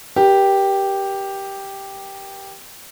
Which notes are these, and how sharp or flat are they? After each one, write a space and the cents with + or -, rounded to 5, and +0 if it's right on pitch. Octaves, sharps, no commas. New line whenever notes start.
G4 +0 A#4 +45